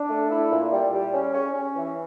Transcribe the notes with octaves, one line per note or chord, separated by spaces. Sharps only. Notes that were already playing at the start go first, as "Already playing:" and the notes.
Already playing: D4
A3
E4
A#2
G3
G3
C#4
C#4
C#4
E3